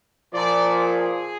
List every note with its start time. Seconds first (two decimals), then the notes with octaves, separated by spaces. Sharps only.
0.33 A#2 F3 D5
0.79 G#4